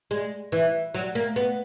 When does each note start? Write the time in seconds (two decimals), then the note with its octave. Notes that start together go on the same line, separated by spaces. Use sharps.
0.11 G#3
0.52 E3
0.94 F#3
1.15 A#3
1.36 B3